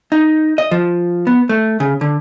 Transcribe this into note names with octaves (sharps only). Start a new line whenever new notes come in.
D#4
D#5
F3
B3
A3
C#3
D3